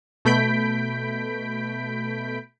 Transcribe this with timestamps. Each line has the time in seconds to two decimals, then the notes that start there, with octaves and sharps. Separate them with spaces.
0.25 B2 A3 B5 G6 B6 D7